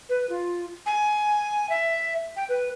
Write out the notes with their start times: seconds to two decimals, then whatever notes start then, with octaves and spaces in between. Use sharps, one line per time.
0.09 B4
0.30 F4
0.86 G#5
1.70 E5
2.36 G5
2.49 B4